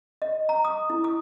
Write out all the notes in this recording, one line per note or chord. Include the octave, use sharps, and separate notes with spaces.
D#5
A#5
D#6
E4
D#6